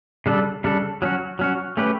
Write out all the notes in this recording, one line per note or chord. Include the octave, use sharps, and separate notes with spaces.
C#3 G3 D4 A4
C#3 G3 D4 A4
F#3 C#4 F#4
F#3 C#4 F#4
A3 C#4 G4 B4